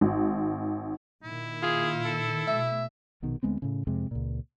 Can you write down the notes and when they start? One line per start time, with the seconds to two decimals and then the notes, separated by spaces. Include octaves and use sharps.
0.01 G#1
1.23 A#2 D#3 E4
1.63 F4 G#4
2.05 A4
2.48 B2 A3 E5
3.22 A#1 B2 D#3
3.43 D2 G#3 B3 C4
3.62 A2 C#3
3.87 F2 C3 G#3
4.11 C#2 A#2